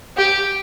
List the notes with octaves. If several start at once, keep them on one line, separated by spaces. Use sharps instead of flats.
G4